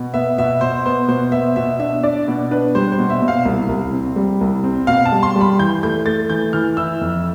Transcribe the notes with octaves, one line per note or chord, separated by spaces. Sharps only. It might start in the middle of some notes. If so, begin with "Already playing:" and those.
Already playing: B2
B3 E5
B2 E5
B2 C5
B3 C5
B2 C5
B3 E5
B2 E5
D4 E5
D4 D5
B2
D4 B4
G3 C5
C5
B2
E5
B2
F5
C2
C2
C4
G3
C2
C4
B2 F5
A5
G3
C6
G3
B5
E3 G6
A3 G6
A3 A6
E3 G6
E3 F6
E4 E6
F2